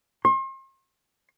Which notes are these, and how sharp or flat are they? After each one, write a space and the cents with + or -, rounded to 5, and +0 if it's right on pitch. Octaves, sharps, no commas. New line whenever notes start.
C6 +40